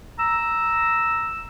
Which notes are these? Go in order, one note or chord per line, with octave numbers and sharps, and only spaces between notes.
A#5 E6